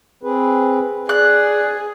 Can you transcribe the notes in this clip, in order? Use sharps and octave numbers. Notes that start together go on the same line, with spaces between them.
C4 G#4 B4
G#4 D5 F#6